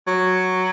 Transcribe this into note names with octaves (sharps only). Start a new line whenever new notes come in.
F#3